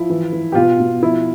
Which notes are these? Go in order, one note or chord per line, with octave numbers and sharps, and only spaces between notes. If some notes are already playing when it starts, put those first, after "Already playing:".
Already playing: F3 E4
E3
E3
G4
B2 F4
B2
F3 E4